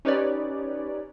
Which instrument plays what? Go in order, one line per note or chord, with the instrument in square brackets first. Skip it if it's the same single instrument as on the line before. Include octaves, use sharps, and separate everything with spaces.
[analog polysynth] C#4 D#4 G4 B4 C#5 D5